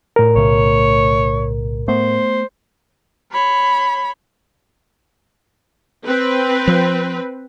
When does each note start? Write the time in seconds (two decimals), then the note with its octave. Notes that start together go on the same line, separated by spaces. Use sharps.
0.16 A2 A#4
0.36 B1 C#3 A3 C#5
1.88 A3 B3 C5
3.32 C#5 B5
6.05 C4 B4
6.67 F3